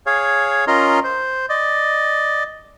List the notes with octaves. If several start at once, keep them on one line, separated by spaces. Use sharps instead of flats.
G#4 C#5 F5
C#4 F4 A#4 D#5 A#5 C6
C5
D5 D#5